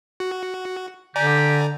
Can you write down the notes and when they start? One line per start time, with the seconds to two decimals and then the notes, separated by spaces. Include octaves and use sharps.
0.20 F#4
1.16 D3 G4 D5 G#5 A#5